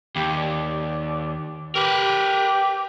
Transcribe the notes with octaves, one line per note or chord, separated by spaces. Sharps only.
D#2 G4
D5
G4 A#4 B4